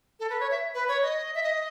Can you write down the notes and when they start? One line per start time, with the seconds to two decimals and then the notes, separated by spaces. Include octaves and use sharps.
0.20 A4
0.30 B4
0.40 C#5
0.51 E5
0.75 B4
0.88 C#5
1.02 D#5
1.35 E5
1.43 D#5